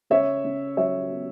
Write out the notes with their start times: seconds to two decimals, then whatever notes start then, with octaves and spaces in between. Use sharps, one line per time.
0.10 C#3 C#5 E5
0.44 C#3
0.77 F#3 C#5 E5
1.10 B3